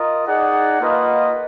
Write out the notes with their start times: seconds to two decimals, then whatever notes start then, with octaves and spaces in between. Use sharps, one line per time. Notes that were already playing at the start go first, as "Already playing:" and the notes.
Already playing: F4 A#4 D#5
0.27 D#4 G#4 D5 F#5
0.79 A#3 F4 B4 D#5 F#5